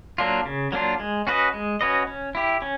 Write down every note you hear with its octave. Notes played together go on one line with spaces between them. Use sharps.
F#3 A#3 D4 F4
C#3
F#3 A#3 D4 F4
G#3
C#4 F#4 B4 D#5
G#3
C#4 F#4 B4 D#5
C#4
E4 G4
C#4